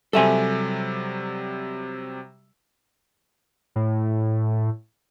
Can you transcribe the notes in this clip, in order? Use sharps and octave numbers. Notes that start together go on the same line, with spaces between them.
C3 F#3 G3 A4 E5 G#5
A2